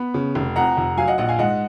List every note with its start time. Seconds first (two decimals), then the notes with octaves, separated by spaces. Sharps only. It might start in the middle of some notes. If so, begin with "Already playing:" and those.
Already playing: B3 B5
0.14 C#3
0.35 F1
0.56 F2 F#5 A#5
0.77 F1
0.97 F#3 F5 G#5
1.07 D#5 F#5
1.18 A#1 D#5 F#5
1.29 F5 G#5
1.39 G#2 D#5 F#5